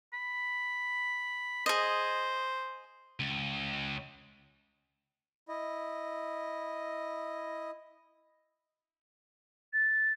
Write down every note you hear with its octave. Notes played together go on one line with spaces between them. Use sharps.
B5
G#4 C5 D#5
C#2
E4 D#5
A6